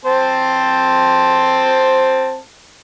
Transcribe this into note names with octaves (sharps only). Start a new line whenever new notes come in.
C4 C5 A5